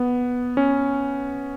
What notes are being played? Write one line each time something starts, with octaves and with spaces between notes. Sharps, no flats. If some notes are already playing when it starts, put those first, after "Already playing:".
Already playing: B3
C#4